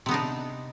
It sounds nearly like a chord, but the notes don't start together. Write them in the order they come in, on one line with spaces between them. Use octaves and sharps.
C3 B3 D#4 D4